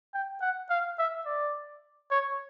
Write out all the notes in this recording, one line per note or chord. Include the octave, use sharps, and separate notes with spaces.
G5
F#5
F5
E5
D5
C#5